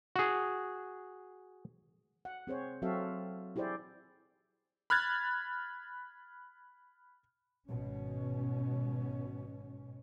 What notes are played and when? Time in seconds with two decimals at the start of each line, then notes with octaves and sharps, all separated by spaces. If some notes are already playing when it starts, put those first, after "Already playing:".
0.16 F#4 G#4
2.25 F#5
2.47 C4 G#4 C5 C#5
2.82 F#3 C4 F#4 A4 E5 F5
3.56 E4 G4 G#4 C5 D5
4.90 B5 F6 F#6 G#6 A6
7.67 G#1 B2 C#4